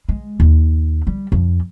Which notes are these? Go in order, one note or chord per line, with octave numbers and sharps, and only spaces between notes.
G#3
D#2
G3
F2